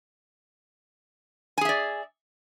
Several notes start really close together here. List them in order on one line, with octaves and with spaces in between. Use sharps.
G#5 G#4 E5 D5